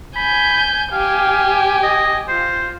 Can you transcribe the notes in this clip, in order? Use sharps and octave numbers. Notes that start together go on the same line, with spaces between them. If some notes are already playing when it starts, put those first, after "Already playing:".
G#5 B5 G6
G4 F5 G#5
D#5
F4 C5